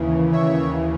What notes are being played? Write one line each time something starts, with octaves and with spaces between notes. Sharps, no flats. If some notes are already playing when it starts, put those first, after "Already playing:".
Already playing: D#2 C#3 E3
C#5 E5